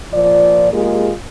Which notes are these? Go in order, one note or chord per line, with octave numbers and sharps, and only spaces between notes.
A#2 F3 D5
G#3 A#3 F4 G4 G#4